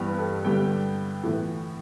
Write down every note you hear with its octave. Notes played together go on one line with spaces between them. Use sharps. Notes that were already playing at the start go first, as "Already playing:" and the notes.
Already playing: G2 E3 G3 B3 G4
B4
A4
G2 D3 G3 B3 G5
A2 E3 B3